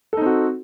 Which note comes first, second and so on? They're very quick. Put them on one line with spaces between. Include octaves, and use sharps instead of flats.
A4 D#4 C4 F#4